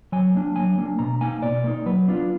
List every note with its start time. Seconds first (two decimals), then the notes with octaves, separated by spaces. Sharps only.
0.12 F#3 G#5
0.35 A#3 D4
0.56 F#3 G#5
0.78 A#3 D4
0.99 B2 A#5
1.21 A#3 D#4 G#5
1.42 B2 D5
1.64 A#3 D#4
1.86 F#3 B4
2.08 B3 D4 F4